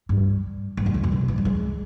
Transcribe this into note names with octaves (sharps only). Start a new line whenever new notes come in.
G2
G2
F2
F#2
G2
B2
E3
G3
G#3